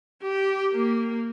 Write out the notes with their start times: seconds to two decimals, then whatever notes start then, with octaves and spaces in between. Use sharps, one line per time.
0.23 G4
0.72 A#3